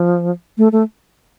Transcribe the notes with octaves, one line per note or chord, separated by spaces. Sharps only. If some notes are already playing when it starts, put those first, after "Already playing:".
Already playing: F3
A3
A3